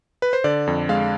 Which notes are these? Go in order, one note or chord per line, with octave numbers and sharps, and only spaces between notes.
B4
C5
D3 D5
F2
G#3 F5